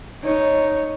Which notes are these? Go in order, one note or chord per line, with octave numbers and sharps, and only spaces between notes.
D#4 C#5